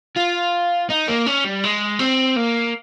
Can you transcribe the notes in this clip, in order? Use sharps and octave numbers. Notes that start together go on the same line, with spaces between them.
F4
D#4
A#3
C#4
G3
G#3
C4
A#3